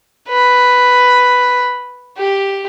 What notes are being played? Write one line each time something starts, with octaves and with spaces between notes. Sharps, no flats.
B4
G4